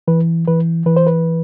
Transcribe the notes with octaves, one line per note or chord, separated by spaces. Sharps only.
E3 B4
E3 B4
E3 B4
C5
B4